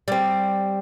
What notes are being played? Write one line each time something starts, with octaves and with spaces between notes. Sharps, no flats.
G3 C4